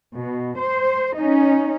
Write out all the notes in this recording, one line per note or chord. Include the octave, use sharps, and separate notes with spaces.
B2
C5
C#4 D#4